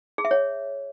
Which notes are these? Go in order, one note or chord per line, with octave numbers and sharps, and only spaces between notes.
G#4
E5
C#5